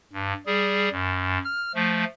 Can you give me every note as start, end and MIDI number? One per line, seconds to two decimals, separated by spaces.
0.13 0.33 43
0.46 0.89 55
0.46 0.89 68
0.92 1.38 42
1.45 1.72 89
1.75 2.04 53
1.75 2.04 57